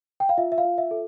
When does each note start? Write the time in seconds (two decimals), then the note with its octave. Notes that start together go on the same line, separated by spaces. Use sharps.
0.20 G5
0.29 F5
0.38 F4 E5
0.52 E5
0.58 F5
0.64 F4
0.78 E5
0.91 A4